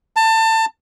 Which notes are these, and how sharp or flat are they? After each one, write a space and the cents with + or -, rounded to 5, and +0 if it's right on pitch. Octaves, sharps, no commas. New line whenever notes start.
A5 +25